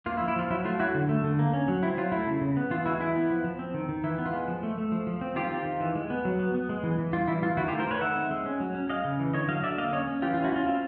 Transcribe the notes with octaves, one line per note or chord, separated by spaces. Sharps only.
A#3 F4
E4
F3
E4
F3 F4
F#3 E4
A3 F4
F#3 E4 F#4
D3
A3
D3
A#3
C#4
F#3
C4 E4
F#3 F4
A3 E4
C#3
C#3
B3
E3 F4
G#3 E4 F#4
E3 E4
B3
F3
F3
C4
D#3
D#3
E3 E4
B3
F4
G#3
F3
A3
A3
F3
F3
C4
D#3 F4 G4
C4
D#3
E3
G#3
B3
F#3
B3
B3
G#3
E3
E3
G3 F4
E3 E4
E3 F4
D#3 E4 F#4
F4 G4
A3
A#4 C5
A3 B4 C#5
D#3 E5 F#5
C4
G#3
C#4
F#3
C#4
G#3 D#5 F5
C#3
E3
D3 C#5 D#5
F#3 D#5 F5
D3 D5 E5
A#3 D#5 F5
C#4 C#5 D#5
C#4
E3 F4 G4
F4
C#4
E4 F#4
C#4 F4
C4